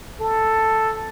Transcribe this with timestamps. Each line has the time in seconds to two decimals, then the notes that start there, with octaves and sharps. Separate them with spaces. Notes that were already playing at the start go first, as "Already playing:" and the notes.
0.20 A4